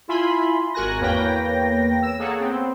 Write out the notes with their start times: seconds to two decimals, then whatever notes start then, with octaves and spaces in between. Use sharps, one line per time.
0.08 E4 F4 E5 G#5 B5 C6
0.74 G#1 F#4 A#4 G#5 F#6 A#6
1.00 E2 A#3 B4 C#5 G5 A#6
2.02 E6 E7
2.19 A#3 G#4 A4 C#5 F#5
2.40 B3 C4